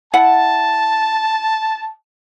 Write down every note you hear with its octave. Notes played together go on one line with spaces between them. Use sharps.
E4 F#5 A5